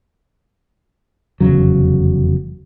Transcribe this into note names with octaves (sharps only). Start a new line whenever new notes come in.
F1 E2 C#3 F#3